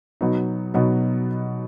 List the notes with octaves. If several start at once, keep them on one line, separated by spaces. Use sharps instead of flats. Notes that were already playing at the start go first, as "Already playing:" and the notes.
B2 F#3 B3 D#4
B2 F#3 B3 D#4